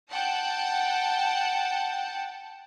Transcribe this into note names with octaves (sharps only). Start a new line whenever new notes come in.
F#5 G5 A5